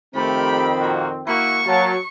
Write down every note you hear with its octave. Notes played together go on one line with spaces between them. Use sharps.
F2 D#3 A3 C4 G4 A#4 B5
A#2 A#3 F#4
A#3 E4 F#4 C#6
F#3 A#3 A5